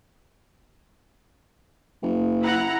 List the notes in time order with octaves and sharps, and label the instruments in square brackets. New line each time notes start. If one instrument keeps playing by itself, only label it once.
[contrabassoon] F#1
[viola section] E4 F#5 A#5